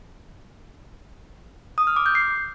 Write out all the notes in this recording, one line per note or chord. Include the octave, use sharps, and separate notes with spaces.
D#6
F6
D6
G6
C7